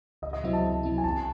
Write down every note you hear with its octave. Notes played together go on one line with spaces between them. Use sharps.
C#2 D#5
D#5
C3 F#3 C4 E4 E5
A5
C#2
C3 F#3 C4 E4
G#5
C2 A5